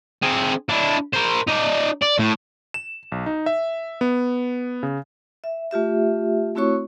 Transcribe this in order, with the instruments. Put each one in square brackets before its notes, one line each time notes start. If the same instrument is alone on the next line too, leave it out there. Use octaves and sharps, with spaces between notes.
[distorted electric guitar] C4 G#4
D4 E4
A#4 C5
D#4 D5
D5
A2
[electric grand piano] E7
B1
D#4
E5
B3
C#3
[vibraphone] E5
A3 F4 G4 E5
A3 C4 E4 F#4 C#5 C#6